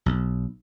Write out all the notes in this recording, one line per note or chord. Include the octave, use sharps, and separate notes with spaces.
B1